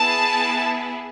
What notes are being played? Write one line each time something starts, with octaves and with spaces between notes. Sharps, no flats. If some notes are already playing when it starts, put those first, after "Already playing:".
Already playing: B3 E4 G#4 A5